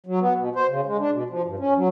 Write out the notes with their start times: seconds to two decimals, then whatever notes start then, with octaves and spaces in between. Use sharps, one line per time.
0.06 F#3
0.21 B3
0.38 B2
0.55 C5
0.69 C#3
0.86 G#3
0.99 D4
1.13 B2
1.30 F3
1.46 G2
1.59 C#4
1.77 F#3